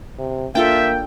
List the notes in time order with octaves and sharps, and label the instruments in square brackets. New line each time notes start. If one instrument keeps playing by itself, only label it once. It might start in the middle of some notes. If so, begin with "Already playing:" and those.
[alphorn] C3
[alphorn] A#3 [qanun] D4 F4 A4 [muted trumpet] E5 [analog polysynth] G5